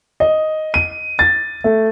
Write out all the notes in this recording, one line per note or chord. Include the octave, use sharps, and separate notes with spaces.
D#5
D#7
A6
A3